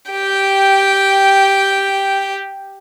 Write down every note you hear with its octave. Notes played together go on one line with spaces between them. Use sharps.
G4 G5